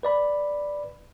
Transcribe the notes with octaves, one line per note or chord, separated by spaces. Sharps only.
B4 D5 B5